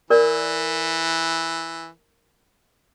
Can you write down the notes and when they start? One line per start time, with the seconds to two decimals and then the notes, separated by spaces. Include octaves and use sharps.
0.10 E3 A#4 D5